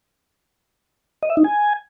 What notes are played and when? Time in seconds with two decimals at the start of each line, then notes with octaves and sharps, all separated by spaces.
1.23 D#5
1.30 E5
1.37 D#4
1.44 G#5